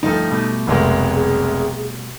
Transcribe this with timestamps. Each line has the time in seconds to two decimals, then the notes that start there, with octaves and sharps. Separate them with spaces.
0.03 D2 G2 F3 D#4 A4
0.30 B2 G3 A3
0.67 F1 C2 G#3
1.15 G#4